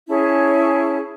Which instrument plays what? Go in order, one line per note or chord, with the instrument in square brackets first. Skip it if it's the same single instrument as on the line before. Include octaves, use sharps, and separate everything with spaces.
[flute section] C#4 E4 G#4 A5